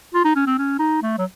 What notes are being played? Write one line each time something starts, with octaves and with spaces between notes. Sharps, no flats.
F4
D#4
C#4
C4
C#4
D#4
A3
F#3